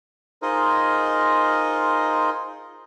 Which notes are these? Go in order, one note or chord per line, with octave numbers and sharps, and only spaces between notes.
D#4 F4 G#4 A#4 C5 D#5